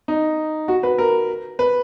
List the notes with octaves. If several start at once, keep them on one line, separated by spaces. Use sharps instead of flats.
D#4
F#4
B4
A#4
B4